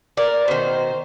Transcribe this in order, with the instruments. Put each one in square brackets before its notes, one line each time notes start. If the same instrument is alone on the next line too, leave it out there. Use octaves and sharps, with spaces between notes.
[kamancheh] A#4 [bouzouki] D5
[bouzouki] B2 D#3 [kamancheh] C5